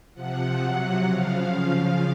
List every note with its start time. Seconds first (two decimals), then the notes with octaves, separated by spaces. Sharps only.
0.14 C3 F3 F#5
0.60 C3 F#3 F#5
1.06 C#3 F3 F5
1.52 C#3 F3 F5